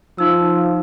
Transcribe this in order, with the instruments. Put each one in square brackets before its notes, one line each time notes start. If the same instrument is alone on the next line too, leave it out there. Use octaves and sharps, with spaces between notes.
[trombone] F3 [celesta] D#4 E6